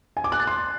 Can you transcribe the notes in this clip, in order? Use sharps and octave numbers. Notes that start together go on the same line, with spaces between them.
G#5
D6
F#6
A6
C6